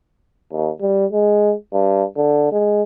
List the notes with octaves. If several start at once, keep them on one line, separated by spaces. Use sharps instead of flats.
D#2
G3
G#3
G2
D3
G#3